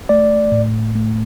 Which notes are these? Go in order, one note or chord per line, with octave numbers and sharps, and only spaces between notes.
A3 D5
A2
A3